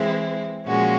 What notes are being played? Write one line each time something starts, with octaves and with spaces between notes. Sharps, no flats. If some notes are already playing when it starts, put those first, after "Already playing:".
Already playing: E3 G#3 C4 E4
A#2 F3 G#3 C#4 F#4